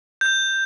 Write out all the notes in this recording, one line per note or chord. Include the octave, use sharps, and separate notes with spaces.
G6